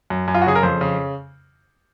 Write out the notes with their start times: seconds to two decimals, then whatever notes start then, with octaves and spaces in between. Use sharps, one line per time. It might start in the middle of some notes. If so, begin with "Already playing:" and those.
0.10 F#2
0.28 F#2
0.34 F4
0.42 F#4
0.46 C#3 G#4
0.55 A#4
0.63 F2 C5
0.81 C#3